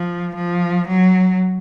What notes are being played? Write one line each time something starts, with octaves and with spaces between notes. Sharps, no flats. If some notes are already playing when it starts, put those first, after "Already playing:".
Already playing: F3
F3
F#3